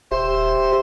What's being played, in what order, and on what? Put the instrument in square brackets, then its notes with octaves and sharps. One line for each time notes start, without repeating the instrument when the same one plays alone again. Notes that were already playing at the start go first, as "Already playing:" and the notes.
[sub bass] D#1 [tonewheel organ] G4 E5 [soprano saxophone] C5